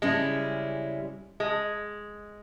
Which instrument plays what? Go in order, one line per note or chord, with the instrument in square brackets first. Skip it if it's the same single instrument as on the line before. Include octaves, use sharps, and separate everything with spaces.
[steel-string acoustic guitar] C#3 G3 C#4 E4 [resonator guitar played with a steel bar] G#3
[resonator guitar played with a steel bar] G#3